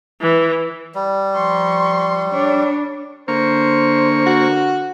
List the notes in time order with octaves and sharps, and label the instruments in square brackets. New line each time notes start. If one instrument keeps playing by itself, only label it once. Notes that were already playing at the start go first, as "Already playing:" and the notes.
[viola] E3
[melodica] G3
[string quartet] F3 C6 C#6
D4 C#5
[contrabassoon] D3 [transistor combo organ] A#3 C#6 [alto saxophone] C5
[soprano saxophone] F#4